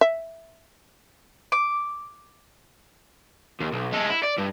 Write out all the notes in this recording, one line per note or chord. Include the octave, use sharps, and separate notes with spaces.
E5
D6
D#2
B1
G#3 A4
E4
D5
G2